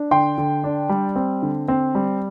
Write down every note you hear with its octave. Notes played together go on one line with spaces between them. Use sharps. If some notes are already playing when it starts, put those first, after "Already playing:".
Already playing: D4
D3 G5 C6
D3
D4
G3
C4
D3
C4
G3